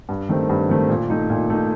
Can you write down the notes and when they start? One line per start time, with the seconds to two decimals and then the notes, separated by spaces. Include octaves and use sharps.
0.09 G2
0.29 D#3 A3 C4
0.50 G2
0.69 D#3 A3 C4
0.89 A#2
1.10 A3 D#4
1.30 A#2
1.50 A3 D#4